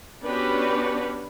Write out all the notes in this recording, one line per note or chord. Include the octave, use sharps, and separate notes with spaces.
B3 C#4 D4 F#4 G4 B4